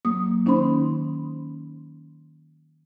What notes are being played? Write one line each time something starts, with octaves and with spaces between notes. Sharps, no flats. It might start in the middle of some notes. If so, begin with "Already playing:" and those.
F#3 A#3 D#6
D#3 C#4 D#4 C5 B5 C6